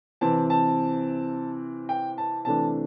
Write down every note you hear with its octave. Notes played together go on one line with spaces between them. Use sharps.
C3 E3 C4 A5
A5
G5
A5
C3 E3 A3 D4 A5